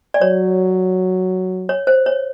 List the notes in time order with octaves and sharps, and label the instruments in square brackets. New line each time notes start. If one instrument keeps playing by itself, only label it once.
[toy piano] D5
[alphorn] F#3 [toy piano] C#5
[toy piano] C#5
C5
C#5